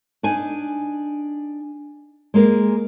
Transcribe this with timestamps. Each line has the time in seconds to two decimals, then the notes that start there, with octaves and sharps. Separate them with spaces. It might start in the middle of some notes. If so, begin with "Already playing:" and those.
0.23 D4 D#4 G#5
2.34 G#3 A#3 G#4 A#4